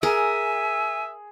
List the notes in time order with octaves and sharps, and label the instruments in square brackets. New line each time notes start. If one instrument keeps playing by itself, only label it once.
[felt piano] G#4 [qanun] A#4 [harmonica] E5 [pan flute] G#5